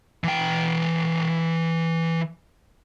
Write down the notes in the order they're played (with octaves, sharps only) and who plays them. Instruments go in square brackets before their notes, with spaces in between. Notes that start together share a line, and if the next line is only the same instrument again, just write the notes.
[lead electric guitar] E3 G5